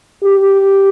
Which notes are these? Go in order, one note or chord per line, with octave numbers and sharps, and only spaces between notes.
G4